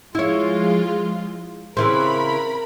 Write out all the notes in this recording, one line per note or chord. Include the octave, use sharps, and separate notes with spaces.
F3 G#3 E4 F4 C#5
C#3 E3 C4 A#4 B5